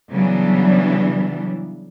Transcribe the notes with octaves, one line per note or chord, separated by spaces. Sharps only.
C#3 E3 F#3 G3 B3 D4